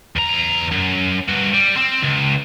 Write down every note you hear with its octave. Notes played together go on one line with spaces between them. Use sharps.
E2 A#5
F#2
G2 F#4
G3
C4
C#2